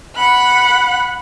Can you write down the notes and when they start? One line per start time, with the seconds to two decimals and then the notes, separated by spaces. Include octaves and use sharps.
0.15 F#5 B5 F#6